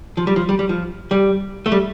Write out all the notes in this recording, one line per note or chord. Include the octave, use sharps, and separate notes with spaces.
F3
G3
F3
G3
G3
F3
G3
A3
G3